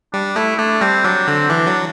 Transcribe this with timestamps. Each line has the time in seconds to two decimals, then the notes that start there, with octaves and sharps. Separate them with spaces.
0.13 G3 D4
0.36 A3 E4
0.59 A3 D4
0.81 G3 C4
1.04 F#3 D4
1.28 D3 C4
1.49 E3 D4
1.67 F#3